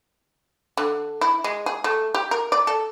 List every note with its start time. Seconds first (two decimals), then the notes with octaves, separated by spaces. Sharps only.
0.77 D3
1.21 E4
1.44 G#3
1.66 G#4
1.84 A3
2.14 G4
2.31 A#4
2.52 D5
2.67 A4